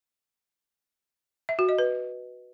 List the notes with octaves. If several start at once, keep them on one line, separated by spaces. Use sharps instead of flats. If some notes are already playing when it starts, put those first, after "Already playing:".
E5
F#4
D#5
B4